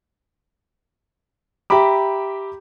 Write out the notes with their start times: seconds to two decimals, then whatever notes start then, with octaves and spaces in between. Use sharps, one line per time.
1.70 G4 E5 A#5 B5 D6